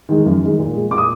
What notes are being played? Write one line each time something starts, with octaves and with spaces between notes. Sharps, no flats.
D#3 G#3
F#2
D#3 G#3
A#2
G#3
A#2 D6
D#6